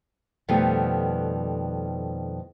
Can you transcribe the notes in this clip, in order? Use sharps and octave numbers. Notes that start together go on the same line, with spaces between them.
F2 B2 D#3 G3 A3 B3